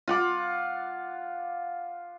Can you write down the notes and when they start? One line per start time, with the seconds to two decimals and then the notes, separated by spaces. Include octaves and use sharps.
0.08 F4 F#5 D6